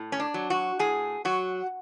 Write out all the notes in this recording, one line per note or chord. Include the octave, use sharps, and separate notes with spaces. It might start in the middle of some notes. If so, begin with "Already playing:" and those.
Already playing: A2
C#4
D4
F#3
F#4
A2 G#4
F#3 F#4